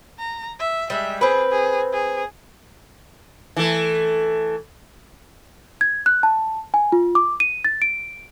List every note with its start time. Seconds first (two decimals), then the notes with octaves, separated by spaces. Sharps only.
0.18 A#5
0.59 E5
0.90 G3 G#3 E5
1.21 C4 G#4 B4
1.51 G#4
1.92 G#4
3.56 E3 A3
5.81 G#6
6.06 F#6
6.23 A5
6.74 G#5
6.92 F4
7.15 D6
7.40 D#7
7.65 A6
7.82 D7